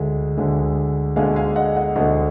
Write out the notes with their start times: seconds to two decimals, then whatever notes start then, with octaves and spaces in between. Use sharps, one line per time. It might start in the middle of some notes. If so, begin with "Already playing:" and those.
Already playing: D2 D3 G#3
0.38 D2 D3 G#3
1.16 D2 D3 G#3 F5 G#5
1.36 F5 G#5
1.56 D#5 F#5
1.76 D#5 F#5
1.96 D2 D3 G#3 D#5 F#5